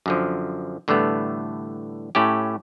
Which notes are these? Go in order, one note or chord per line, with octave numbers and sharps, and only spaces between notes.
F#2 D3 F3
A2 D3 E3 G3 A3 B3
A2 A3 C#4 G4